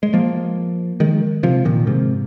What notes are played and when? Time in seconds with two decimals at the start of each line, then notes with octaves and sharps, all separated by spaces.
0.03 G#3
0.14 F3 A#3
1.00 D#3 G#3
1.43 C3 F3
1.65 A#2 D#3
1.87 G#2 C3